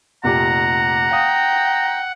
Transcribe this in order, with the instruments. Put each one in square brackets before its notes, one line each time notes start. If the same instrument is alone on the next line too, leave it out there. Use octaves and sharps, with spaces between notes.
[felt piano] F1 A#2 G4 [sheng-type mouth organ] F#5 [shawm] A#5
[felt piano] F5 D#6 [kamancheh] G5